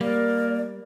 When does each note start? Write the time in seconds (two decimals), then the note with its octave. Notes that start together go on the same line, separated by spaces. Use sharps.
0.01 G3 A#3 A#4 D5